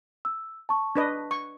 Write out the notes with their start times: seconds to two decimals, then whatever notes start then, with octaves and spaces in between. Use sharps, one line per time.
0.25 E6
0.69 A5 C#6
0.96 D4 B4 D#5
1.31 C#6